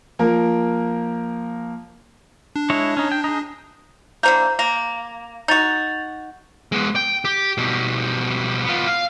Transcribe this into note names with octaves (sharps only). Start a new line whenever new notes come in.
F3 A#3 A#4
D4
G#3 E4 C#5
C#4 D#4
G5
D#4 G#4
D3 E3 A#3 C5 A#5 G6
A#3 A#6
D#4 F#4 G6 A6 F7
G#3 B3
G5
G4
B2 G3
B3 F4
F5